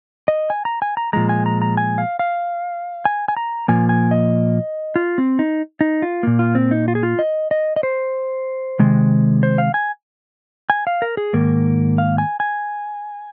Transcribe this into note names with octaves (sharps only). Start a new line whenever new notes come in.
D#5
G#5
A#5
G#5
A#5
A#2 F3 G#3 A#5
G#5
A#5
A#5
G#5
F5
F5
G#5
G#5
A#5
A#2 F3 A#3 G#5
G#5
D#5
F4
C4
D#4
D#4
F4
A#2 A#3
F4
C4
D#4
F4
G#4
F4
D#5
D#5
D#5
C5
C3 D#3 G#3
C5
F5
G#5
G#5
F5
A#4
G#4
G#2 D#3 A#3 A#4
F5
G#5
G#5